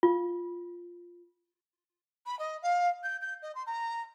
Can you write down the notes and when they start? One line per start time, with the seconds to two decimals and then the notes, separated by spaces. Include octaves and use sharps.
0.03 F4
2.26 B5
2.39 D#5
2.62 F5
3.04 G6
3.21 G6
3.42 D#5
3.55 C6
3.67 A#5